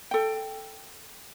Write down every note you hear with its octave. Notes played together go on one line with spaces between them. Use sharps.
A4 G5